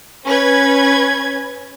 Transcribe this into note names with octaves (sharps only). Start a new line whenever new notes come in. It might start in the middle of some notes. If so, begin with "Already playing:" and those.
C#4 B4 G#6